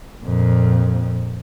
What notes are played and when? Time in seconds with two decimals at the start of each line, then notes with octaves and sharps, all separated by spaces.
0.25 F2 A#2